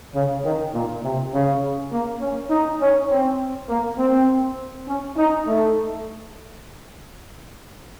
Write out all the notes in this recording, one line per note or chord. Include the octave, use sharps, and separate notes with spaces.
C#3
D#3
A#2
C3
C#3
A#3
C#4
D#4
C#4
C4
A#3
C4
C#4
D#4
A3